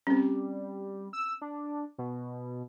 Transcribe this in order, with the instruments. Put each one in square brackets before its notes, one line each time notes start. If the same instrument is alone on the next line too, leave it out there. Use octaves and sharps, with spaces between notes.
[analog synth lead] G3 [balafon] C4 C#4
[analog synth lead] E6
D4
B2